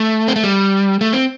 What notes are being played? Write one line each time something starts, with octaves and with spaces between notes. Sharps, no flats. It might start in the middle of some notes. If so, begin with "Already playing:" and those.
Already playing: A3
C4
A3
G3
A3
C4